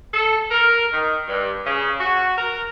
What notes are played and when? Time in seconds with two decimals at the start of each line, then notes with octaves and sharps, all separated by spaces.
0.13 A4
0.49 A#4
0.93 D#3
1.28 G2
1.65 C#3
2.00 F#4
2.38 A#4